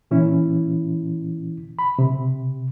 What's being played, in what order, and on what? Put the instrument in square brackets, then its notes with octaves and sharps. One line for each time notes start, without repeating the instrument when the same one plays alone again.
[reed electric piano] A#2 E3 C#4 E4
B5
C3